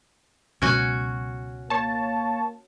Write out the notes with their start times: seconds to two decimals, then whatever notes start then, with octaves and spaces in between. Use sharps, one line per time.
0.62 C#2 B2 F#3 C#4 F#4 G#5
1.70 A#3 C#5 A5